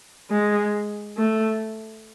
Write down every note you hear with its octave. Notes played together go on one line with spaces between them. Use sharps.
G#3
A3